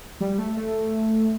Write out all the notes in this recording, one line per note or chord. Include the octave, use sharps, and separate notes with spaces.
G3
A3
A3